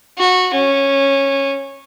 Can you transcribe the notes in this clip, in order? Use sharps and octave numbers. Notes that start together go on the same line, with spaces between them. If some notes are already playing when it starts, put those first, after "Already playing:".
F#4
C#4